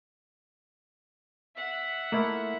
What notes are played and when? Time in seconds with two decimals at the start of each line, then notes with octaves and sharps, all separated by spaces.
1.56 E5 F#5
2.12 A3 A#3 E4 F4